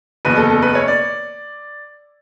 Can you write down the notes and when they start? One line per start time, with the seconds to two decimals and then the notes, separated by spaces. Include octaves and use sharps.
0.25 F#1 E2 B2 B4
0.37 A4
0.50 A4
0.62 B4
0.75 C#5
0.88 D5